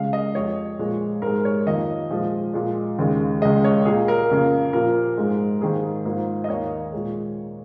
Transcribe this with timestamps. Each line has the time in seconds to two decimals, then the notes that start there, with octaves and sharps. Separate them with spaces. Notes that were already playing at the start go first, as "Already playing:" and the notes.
Already playing: C#2 C#3 G#3 F5
0.13 D#5
0.34 F2 F3 G#3 C#5
0.79 A#2 F3 G#3
1.22 G#2 G#3 A#4
1.45 C#5
1.66 F2 D#3 A#3 D#5
2.10 A#2 F3 G#3
2.53 A#2 G#3
2.99 D#2 C#3 G#3
3.42 C#2 C#3 G#3 D#5
3.64 C#5
3.85 A#2 A#3 G#4
4.08 A#4
4.30 F2 C#3 A#3
4.73 A#2 F3 A#3 A#4
5.18 G#2 G#3
5.61 G#2 D#3 A#3 G#4
6.05 G#2 F3 A#3
6.44 D#5
6.49 D#2 D#3 A#3 C#5
6.92 A#2 G#3